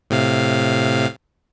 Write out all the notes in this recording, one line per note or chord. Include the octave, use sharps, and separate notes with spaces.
A2 C3 F5